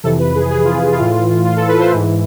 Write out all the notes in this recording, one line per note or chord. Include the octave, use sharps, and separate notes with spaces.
F2 C3 E3 A4
B4
G#4
G#4
F4
F4
A2 E3
F4
A4
B4
C5
G#2 E3